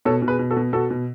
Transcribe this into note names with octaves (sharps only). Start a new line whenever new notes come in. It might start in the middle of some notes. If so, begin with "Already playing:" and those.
B2 A4 C#5
B2
G#4 B4
B2
F#4 A4
B2
B2 F#4 A4
B2